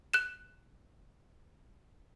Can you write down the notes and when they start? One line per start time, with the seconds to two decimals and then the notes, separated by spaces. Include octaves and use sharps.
0.14 F#6 E7